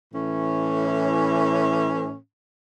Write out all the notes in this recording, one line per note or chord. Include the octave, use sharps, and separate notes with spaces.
A2 E3 C#4